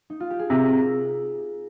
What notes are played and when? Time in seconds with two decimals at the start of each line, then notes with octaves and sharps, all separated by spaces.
0.10 D#4
0.20 F4
0.30 G4
0.39 G#4
0.50 C3 A#4